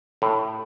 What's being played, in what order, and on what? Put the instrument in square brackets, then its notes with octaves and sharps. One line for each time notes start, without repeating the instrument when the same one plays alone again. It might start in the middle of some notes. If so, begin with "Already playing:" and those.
[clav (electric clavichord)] A2